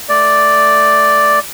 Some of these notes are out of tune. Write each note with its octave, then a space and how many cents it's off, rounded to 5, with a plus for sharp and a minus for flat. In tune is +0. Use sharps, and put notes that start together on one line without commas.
A3 +0 D5 +0